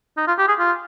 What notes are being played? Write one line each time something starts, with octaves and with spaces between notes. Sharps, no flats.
D#4
F4
G4
G#4
F4